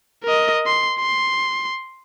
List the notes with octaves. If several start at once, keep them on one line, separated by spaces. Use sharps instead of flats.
A#4 D#5
C6
C6